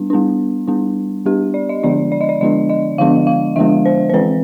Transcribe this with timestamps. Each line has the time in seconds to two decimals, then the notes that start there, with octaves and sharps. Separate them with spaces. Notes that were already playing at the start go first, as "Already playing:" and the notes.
Already playing: G3 B3 D4
0.10 G3 B3 D4
0.67 G3 B3 D4
1.25 G3 B3 D4 G4
1.54 D5
1.69 D#5
1.83 D3 F3 G#3 B3 D4 D5
2.12 D5
2.21 D#5
2.29 D5
2.41 D3 F3 G#3 B3 D4 D#5
2.69 D#5
2.98 D3 F3 G#3 B3 D4 F5
3.27 F5
3.56 D3 F3 G#3 B3 D4 E5
3.85 C5
4.09 C5
4.13 E3 G#3 C4 B4